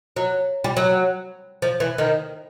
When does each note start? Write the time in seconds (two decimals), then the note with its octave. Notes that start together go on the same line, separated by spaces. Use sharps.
0.16 F#3
0.64 G3
0.77 F#3
1.62 F3
1.80 E3
1.98 D#3